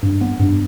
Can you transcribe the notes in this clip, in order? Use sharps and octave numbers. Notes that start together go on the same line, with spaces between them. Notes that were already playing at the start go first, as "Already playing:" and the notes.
G2
B3
G2